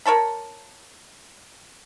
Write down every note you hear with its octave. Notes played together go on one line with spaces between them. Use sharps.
A#4 C#5 A5 B5